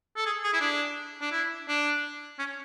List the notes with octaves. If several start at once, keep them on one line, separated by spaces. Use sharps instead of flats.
A4
G#4
G#4
E4
D4
D4
E4
D4
C#4